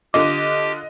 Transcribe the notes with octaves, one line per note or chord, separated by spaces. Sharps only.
D3 D4 F4 G4 D#5 D6